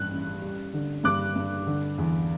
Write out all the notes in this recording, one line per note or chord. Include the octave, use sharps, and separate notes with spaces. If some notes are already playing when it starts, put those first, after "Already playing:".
Already playing: A1 G2 F#6
A1
G3
D3
G2 D6 F#6
G2
D3
E2